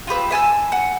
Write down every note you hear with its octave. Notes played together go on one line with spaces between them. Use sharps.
F4 G4 B4 E6
E5 G#5 A5 E6
F#5